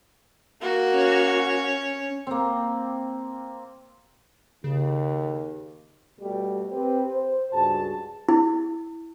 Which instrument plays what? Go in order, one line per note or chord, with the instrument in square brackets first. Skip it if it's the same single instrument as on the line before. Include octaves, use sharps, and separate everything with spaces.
[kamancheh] A#3 F#4
[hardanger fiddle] C#4 C#5
[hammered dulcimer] A#3 C4
[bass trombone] D#2 [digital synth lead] C#3
[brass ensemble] B2 G3 A3 G4
C4 G4 B4
C5
C#2 G2 F#4 G#4 A5
[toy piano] E4